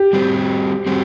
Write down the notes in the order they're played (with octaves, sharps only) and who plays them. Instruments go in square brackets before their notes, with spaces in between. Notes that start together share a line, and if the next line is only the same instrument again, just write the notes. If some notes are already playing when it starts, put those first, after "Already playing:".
Already playing: [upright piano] G4
[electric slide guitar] G3 C4 F#4 C5
G3 C4 F#4 C5